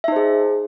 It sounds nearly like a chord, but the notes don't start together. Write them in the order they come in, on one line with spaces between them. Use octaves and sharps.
E5 D#4 C5 G#4